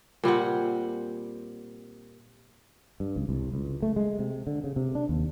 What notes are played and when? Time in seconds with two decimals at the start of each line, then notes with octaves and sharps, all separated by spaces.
0.24 A#2 G3 C4 F#5
3.00 G2
3.16 C#2
3.29 C2
3.54 C#2
3.82 A3
3.96 G#3
4.19 C3
4.47 D3
4.64 C#3
4.76 C3
4.95 D4
5.09 D#2